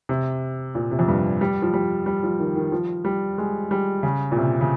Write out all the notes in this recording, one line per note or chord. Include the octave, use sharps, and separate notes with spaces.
C3
A#2
C3
F2
G2
G3
F3
G3
G3
F3
D#3
D#3
F3
G3
G#3
G3
C#3
A#2
C3
C#3